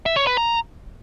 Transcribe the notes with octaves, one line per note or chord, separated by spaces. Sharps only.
E5
C#5
B4
A#5